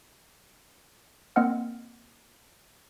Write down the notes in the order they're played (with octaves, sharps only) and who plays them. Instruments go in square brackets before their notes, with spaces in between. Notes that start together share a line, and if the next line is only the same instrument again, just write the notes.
[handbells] A#3 C4 D#5 F#5 F6